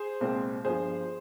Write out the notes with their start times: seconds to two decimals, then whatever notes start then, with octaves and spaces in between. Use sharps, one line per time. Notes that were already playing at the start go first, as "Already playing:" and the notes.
Already playing: G#4 C5
0.21 C2 A#2 G#3 C4
0.64 G1 G2 F3 G#4 C5